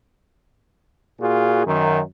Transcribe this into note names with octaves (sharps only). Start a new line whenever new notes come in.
A#2 F4 F#4 G#4
F#2 D#3